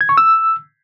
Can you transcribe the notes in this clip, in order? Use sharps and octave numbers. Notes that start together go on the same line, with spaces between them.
G#6
C#6
E6